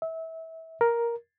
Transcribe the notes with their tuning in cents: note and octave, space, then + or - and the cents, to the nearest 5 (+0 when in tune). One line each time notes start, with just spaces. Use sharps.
E5 -25
A#4 +5